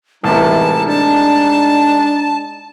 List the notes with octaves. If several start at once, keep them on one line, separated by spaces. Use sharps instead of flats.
C2 A2 C3 E3 G#3 D#4 A5
D4 A5